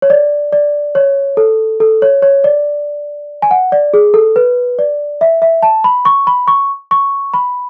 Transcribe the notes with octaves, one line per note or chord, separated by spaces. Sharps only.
C#5
D5
D5
C#5
A4
A4
C#5
C#5
D5
G#5
F#5
D5
G#4
A4
B4
D5
E5
E5
A5
B5
C#6
B5
C#6
C#6
B5